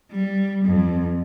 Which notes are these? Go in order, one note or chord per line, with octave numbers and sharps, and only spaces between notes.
G3
F2